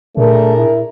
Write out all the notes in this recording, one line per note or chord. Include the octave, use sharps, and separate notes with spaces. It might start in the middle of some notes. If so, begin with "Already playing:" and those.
A#2 A3 D4 G#4 A#4
E4